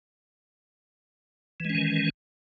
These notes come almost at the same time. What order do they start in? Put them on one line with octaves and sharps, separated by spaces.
E3 G#3 C#4 D#3